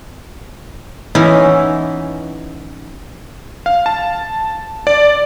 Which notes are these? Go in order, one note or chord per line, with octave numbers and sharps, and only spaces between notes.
E3 B3 C#4 D#4 E4
F5
A5
D5